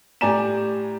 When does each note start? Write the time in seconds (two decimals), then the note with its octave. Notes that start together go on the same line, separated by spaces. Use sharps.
0.21 A2 G4 D5 G#5 A#5 E7